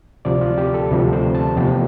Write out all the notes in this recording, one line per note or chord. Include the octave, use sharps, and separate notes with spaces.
D2 C3 F3 D5
F4
G4
A4
D2 C3 F3 B4
C5
A5
E2 C3 F3 A3 G5